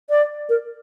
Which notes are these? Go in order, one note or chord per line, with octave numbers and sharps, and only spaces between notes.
D5
A#4